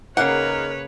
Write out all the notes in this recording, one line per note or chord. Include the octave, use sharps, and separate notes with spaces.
C#3 A#3 D#4 G#4 A#4 B4 C#5 F#5